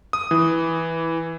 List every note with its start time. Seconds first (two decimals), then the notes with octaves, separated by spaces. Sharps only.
0.13 D#6
0.31 E3